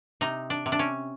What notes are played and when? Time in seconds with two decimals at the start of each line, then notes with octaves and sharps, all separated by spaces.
0.21 C3 D#4
0.50 D4
0.66 C3
0.72 D4
0.79 C#4